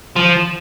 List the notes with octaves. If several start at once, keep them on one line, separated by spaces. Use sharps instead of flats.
F3